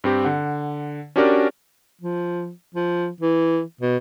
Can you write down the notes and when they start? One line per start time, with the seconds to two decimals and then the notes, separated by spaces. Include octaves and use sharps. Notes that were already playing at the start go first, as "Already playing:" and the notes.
0.04 G2 C4 G4
0.25 D3 F#5
1.16 C#4 D4 F#4 G4 A#4 D5
2.01 F3
2.74 F3
3.21 E3
3.81 B2